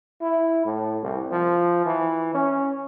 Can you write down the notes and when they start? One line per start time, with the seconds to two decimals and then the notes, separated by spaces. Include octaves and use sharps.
0.21 E4
0.65 A2
1.03 C2
1.31 F3
1.85 E3
2.34 C#4